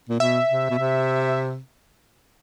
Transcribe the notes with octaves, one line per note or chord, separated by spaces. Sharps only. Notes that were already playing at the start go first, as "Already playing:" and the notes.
A#2
B2 E5
C3
B2
C3